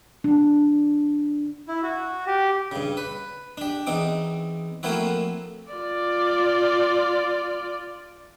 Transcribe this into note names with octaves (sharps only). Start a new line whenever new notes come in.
D4
E4
F#4
G4
G2 C#3
B4
D4 G4
E2 C4 D#4 D6
F3 A3 A#3 C4 E4 F#4
F4 D5